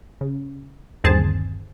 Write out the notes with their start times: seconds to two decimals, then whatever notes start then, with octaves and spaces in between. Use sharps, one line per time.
0.21 C#3
1.04 G1 D#2 C4 G#4 C5 A5